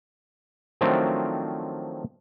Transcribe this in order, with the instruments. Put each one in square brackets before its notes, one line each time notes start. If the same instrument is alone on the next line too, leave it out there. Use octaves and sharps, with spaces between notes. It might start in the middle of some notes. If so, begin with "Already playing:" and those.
[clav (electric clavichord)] D#3 F3 F#3 A3 C4 D4